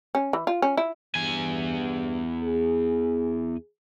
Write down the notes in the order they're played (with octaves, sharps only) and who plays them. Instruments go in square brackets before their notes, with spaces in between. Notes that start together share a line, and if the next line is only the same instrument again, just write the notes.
[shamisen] C#4
E3
F4
C#4
E4
[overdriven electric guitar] E2 G#5 [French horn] G2
[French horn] G#4